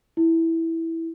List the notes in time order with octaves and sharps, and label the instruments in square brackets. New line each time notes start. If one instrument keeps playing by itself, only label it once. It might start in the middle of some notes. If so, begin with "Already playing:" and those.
[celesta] E4